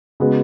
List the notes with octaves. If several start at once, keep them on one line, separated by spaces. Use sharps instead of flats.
C#3 G#3 B3 F#4